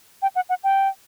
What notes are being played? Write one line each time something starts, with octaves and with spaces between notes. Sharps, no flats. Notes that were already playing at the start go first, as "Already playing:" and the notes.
G5
F#5
F#5
G5